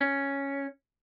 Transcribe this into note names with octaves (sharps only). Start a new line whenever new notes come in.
C#4